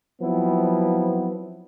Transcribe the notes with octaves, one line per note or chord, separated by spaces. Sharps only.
F3 F#3 B3 C4 E4